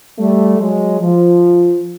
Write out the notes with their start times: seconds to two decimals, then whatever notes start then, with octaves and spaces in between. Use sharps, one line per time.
0.18 G3 A3
0.59 F#3 G#3
1.01 F3